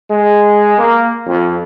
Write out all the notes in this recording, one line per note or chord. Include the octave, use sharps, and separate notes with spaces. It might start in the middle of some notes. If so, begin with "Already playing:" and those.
G#3
A#3
F2